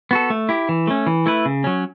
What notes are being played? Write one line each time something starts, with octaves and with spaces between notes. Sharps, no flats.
B3 F#4 A4
A3
E4 G4
E3
A3 C#4
E3
A3 E4 B4
C#3
F#3 C#4